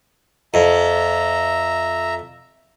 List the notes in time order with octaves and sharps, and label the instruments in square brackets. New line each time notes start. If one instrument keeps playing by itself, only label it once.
[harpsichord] F2 [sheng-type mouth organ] E5 A#5